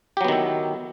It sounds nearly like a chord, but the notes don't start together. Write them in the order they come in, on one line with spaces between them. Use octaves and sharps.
G4 F#3 B3 D#3 E4